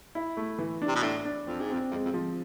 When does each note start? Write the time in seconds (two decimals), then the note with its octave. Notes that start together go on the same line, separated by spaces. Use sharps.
0.15 E4
0.37 A3
0.58 E3
0.82 D4
0.88 C3
0.96 B2
1.03 A2 D4
1.25 D4
1.47 F2 C4
1.61 G#2
1.69 F2 C4
1.91 F2 G#3
2.05 F2
2.14 F3